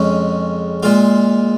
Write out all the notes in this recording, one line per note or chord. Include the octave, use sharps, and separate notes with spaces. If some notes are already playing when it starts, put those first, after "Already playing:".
Already playing: F2 C#3 G#3 C#4
A#2 G#3 F4